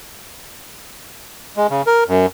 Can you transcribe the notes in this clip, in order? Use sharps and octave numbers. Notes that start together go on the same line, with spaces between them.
G#3
C#3
A#4
F#2